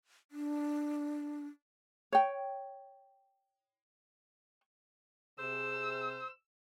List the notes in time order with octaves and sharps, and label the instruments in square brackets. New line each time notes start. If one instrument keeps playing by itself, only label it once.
[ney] D4
[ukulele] C#5 G5
[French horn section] C3 G#4 [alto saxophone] C5 [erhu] E6